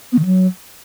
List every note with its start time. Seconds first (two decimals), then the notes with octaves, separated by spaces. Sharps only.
0.12 B3
0.19 D#3
0.25 F#3